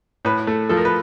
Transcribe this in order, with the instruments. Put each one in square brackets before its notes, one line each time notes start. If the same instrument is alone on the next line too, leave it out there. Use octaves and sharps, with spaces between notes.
[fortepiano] A2 B4
A3
F3 A4
A#4
B4